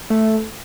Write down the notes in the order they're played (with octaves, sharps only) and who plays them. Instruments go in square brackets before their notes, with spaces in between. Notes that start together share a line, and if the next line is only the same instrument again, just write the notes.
[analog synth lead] A3